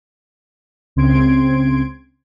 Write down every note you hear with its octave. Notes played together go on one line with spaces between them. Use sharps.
C#2 C#3 C4 C6 G#6 D7